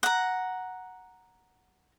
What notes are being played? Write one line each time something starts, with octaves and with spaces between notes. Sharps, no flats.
F#5 A#5